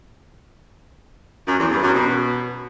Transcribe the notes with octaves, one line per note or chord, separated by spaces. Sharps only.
F#2
E2
G2
F#2
B2